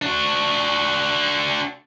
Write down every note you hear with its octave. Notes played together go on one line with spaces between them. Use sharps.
D4 F#4